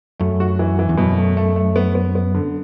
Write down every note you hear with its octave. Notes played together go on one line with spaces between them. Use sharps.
F#2 A3
F#4
E3
E3
E2
F#2 B2
A3
A3
A3
B3
B3
B3
D3